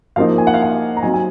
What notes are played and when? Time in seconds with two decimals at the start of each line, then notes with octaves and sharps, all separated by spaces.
0.16 F3 A#3 D#4 F5
0.38 G#5
0.47 F#5
0.54 F5
0.63 F#5
0.97 A#5
1.02 F#3 C4 D#4 G#5
1.14 G#5